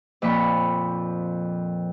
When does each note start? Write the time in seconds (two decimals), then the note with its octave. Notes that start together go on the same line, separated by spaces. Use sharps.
0.22 F2 A#2 F3 B5 C#6